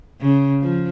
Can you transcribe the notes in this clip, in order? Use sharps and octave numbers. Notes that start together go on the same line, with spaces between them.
C#3
F3